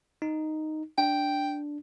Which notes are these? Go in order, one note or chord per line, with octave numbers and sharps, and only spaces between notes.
D#4
D4 G5